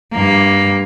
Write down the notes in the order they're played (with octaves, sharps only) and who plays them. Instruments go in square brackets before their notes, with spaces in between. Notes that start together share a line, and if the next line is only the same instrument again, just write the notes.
[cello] G2 A#3